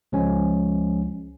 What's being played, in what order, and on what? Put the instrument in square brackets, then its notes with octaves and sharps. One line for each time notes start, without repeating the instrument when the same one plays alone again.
[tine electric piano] C#2 F3 G#3 C#4